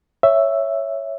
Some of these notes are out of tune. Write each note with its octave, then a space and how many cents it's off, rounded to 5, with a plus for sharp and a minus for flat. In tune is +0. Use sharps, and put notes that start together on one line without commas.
C#5 +0 E5 +5